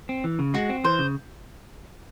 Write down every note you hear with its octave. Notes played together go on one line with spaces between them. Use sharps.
C4
E3
C#3
G#3 F#4
C4
E3 C5
C#3